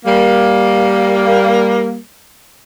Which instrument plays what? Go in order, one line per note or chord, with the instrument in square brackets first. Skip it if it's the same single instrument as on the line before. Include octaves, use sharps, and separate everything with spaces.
[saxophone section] G3 A#3